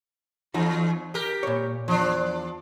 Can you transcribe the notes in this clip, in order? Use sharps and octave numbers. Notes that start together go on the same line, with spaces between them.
E2 D#4 F4 F#4
G4 A#4
A#2 C#5
E2 F3 D4